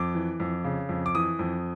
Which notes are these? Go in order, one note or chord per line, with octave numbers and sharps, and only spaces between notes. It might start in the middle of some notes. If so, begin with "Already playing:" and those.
Already playing: F2 D6
E3
F2
C#3
F2
D6
E3 D#6
F2